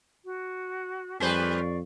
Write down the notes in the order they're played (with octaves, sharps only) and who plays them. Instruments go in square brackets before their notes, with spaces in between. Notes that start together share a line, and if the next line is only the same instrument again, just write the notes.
[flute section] F#4
[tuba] F2 [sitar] G3 B4 C5 [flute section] D5 F5 C#6